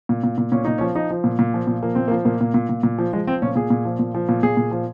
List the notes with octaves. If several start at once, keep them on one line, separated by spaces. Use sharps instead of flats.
A#2
A#2
A#2
A#2 C#4
A#2 D#4
C#4
F3
F3 D#4
F3
A#2
A#2
F3
A#2
F3 A#3
A#2 C4
A#3
F3
A#2 A#3
A#2
A#2
A#2
A#2
F3
F3 G#3
F3 C4
A#2 C#4
A#2 G#4
A#2
F3
A#2
F3
A#2
A#2 G#4
A#2
F3